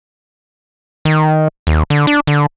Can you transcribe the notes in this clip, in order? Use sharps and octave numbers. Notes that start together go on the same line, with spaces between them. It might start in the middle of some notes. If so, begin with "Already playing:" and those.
D#3
D#2
D3
D4
D3